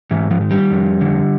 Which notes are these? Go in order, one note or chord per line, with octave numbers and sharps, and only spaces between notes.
G#2 E3
F3
D#3
G3
F2
D3